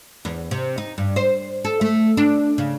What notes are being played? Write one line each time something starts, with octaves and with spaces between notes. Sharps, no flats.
E2
C3
D#4
G2
C5
A4
A3
D4
C#3